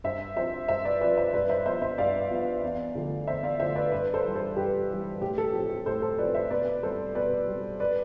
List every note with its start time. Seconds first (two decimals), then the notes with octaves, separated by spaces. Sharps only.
0.04 G2 C5 E5
0.36 F3 C4 C5 E5
0.68 G2 C5 E5
0.85 B4 D5
1.01 F3 C4 B4 D5
1.17 C5 E5
1.33 G2 B4 D5
1.49 C5 E5
1.66 F3 B3 C5 E5
1.82 C5 E5
1.98 G2 D5 F5
2.30 F3 B3
2.63 E2
2.95 D3 F3 A3
3.27 E2 C5 E5
3.43 D5 F5
3.60 D3 F3 A3 C5 E5
3.75 B4 D5
3.92 G2 B4 D5
4.14 A4 C5
4.24 E3 G3
4.35 A4 C5
4.56 G2 G4 B4
4.89 E3 G3
5.21 A2 G4
5.38 A4
5.53 F3 C4 G4
5.70 G4
5.86 A2 A4 C5
6.02 A4 C5
6.18 F3 C4 B4 D5
6.34 C5 E5
6.50 B2 B4 D5
6.83 G3 C4 A4 C5
7.15 B2 B4 D5
7.48 G3 C4
7.80 B4 D5